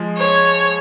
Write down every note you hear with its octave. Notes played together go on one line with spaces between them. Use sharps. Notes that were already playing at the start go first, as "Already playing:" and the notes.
Already playing: F3 G#3
C#5